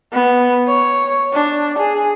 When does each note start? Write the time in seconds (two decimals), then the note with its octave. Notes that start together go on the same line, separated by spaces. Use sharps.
0.13 B3
0.68 C#5
1.33 D4
1.78 G#4